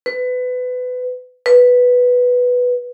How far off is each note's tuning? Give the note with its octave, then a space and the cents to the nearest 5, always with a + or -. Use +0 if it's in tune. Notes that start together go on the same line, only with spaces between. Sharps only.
B4 +25
B4 +0